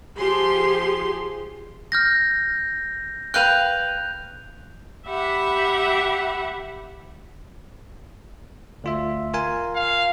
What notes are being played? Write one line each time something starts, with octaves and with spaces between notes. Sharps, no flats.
F3 G4 G#4 C6
F6 G6 A#6
B4 F5 G5 F#6 G6 F7
G4 E5 F#5 B5
D2 F4 E5
F4 A#4 G#5
F5